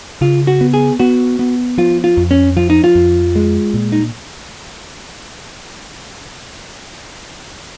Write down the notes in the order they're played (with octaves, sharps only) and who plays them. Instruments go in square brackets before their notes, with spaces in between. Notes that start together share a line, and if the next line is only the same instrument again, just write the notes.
[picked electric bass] C#3 [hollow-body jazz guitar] F4
[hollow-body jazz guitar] F#4
[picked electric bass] B3
[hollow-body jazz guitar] G#4
[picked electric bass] B3 [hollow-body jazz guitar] F#4
[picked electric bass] B3
[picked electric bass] F3 [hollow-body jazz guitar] F4
[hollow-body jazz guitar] F4
[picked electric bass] F2
[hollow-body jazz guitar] C#4
[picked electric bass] F3 [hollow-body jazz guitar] F4
[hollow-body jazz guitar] D#4
F4
[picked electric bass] F2
G#3
A#2
[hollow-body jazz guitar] D#4